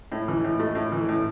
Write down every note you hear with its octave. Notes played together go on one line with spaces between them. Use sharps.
A2
E3
A2
A3
A2
E3
A2